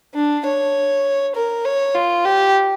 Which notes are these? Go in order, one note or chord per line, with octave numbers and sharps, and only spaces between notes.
D4
C#5
A#4
C#5
F4
G4